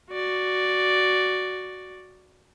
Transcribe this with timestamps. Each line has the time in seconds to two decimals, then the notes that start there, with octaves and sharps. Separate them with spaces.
0.10 F#4 D5